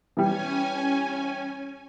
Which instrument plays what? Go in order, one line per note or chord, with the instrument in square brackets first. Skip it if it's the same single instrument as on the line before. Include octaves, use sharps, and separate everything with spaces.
[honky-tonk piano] E3 G3 [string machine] C#4 G#5